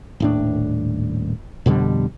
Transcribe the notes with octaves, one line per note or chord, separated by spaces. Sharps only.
D#1 A2 D4
F2 B2 D3 G3